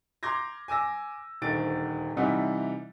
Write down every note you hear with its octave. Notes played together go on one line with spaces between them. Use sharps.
A#5 C6 D6 G6 G#6 A#6
G#5 D6 E6 A#6
D#1 D2 D#3 A6 D7
C3 E3 G3 D#4 F#5